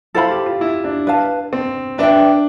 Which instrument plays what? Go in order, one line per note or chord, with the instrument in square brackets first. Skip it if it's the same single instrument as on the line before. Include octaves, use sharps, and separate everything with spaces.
[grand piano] E4 [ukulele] A4 C5 F5 B5
[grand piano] G4
F4
E4
D4
[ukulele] B4 F5 A5
[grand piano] C4
[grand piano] D4 [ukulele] B4 E5 G5